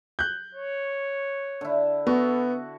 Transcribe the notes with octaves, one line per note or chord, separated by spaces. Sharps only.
F#6 G6
C#5
D3 E4
B3 F#4 A4